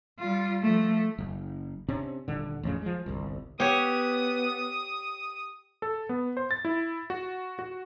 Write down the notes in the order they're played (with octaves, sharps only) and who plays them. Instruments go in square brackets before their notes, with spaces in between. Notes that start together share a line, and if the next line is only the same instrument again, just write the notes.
[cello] G3 F4
F3 A3
[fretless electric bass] F#1
C3 C#4 D4
D#1 D3
A1 F2 C#3
F3 G#3
G1 C2
[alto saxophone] B3 [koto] G4 C#5 [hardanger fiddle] D#6
[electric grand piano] A4
B3
C5
A6
E4
F#4
F#4